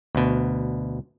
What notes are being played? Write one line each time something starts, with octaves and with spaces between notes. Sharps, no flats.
D2 B2